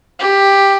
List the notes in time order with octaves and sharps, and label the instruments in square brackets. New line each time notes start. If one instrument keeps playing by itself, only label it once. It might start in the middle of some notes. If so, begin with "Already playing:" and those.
[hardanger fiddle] G4